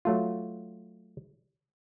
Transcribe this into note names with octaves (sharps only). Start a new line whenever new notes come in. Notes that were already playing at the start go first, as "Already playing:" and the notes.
F#3 A3 F4